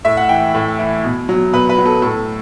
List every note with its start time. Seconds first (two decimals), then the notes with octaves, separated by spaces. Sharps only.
0.05 A2 E5
0.17 F#5
0.29 E3 G5
0.54 A2
0.79 E3
1.04 B2
1.29 F#3
1.53 B2 B4
1.69 B4
1.78 F#3
1.86 A4
2.02 A2 A4